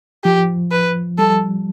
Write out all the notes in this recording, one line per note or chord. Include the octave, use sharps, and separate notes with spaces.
F3 G4
B4
G3 A4